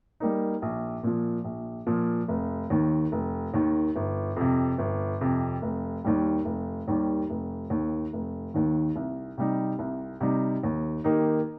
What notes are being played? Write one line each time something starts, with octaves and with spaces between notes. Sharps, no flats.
G3 A#3 D#4
A#1
A#2 F3
A#1
A#2 F3
F1
D#2 D#3
F1
D#2 D#3
G1
F2 C3
G1
F2 C3
F1
D#2 D#3 G3
F1
D#2 D#3 G3
F1
D#2 D#3
F1
D#2 D#3
C2
C3 G3 D#4
C2
C3 G3 D#4
D#2
D#3 A#3 D#4 G4